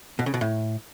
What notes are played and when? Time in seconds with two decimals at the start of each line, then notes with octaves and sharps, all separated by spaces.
0.19 B2
0.26 C#3
0.34 B2
0.41 A2